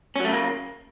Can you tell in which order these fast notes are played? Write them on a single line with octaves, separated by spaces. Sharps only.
C#4 F#3 A3 C#3 A#3